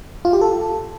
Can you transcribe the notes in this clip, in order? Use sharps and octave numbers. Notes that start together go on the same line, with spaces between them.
F4
G4
A4